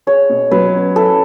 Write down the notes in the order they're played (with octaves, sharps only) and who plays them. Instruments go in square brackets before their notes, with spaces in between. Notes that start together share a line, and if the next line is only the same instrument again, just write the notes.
[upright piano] G#4 [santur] C#5
[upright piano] B2
[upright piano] F#3 [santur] B4
[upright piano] C#4
[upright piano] E4 [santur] A4